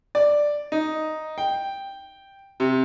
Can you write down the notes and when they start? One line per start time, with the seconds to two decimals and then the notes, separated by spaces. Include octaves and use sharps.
0.15 D5
0.72 D#4
1.38 G5
2.60 C3